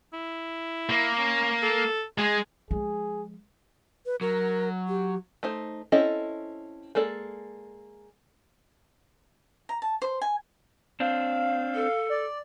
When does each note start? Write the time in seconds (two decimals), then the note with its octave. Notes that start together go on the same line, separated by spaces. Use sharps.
0.13 E4
0.89 A#3
1.18 C#4
1.63 A4
2.18 G#3 G#4
2.71 F3 G#3 G#4
4.06 B4
4.21 F#3 A#4
4.88 G4
5.43 A3 D#4 C5
5.92 C4 C#4 E4 A4 D#5
6.95 G#3 A#3 A4 D5
9.69 A#5
9.82 A5
10.02 C5
10.22 G#5
11.00 C4 D4 F5
11.75 A4
12.10 D5